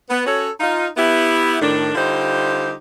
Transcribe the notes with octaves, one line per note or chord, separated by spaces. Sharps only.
B3
C#4 F#4 A4 C#5
D#4 F4
B3 E4 G4
A2 D#3 D4
D3 G3 D#4 F4 G4 C5